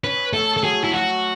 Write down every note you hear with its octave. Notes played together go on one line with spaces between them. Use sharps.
C#4 B4
A3 A4
A4
F#3 G#4
E4
F#3 F#4